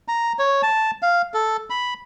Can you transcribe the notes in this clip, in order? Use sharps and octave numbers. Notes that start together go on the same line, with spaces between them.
A#5
C#5
A5
F5
A4
B5